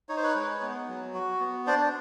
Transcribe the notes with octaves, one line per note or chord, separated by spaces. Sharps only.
D#4 C#5
C5
B4 C#5
G#3
B3
F#3
F#4
B3
D4 C5 D5